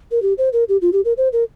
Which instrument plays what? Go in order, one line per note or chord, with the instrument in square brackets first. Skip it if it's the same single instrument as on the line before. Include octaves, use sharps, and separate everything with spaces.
[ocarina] A#4
G4
C5
A#4
G4
F4
G4
A#4
C5
A#4